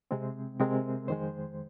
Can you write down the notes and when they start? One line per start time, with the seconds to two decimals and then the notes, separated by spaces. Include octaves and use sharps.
0.11 C3 G#3 C4
0.60 C3 G#3 C4 A#4
1.08 F2 D#3 G#3 C5